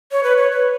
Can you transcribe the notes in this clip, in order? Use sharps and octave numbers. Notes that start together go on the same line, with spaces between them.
C#5
B4
C#5
B4